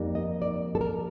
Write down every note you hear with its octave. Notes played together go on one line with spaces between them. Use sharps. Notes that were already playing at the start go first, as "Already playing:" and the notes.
Already playing: F2 G3 A#3 D#4
D#5
D5
A4
A#4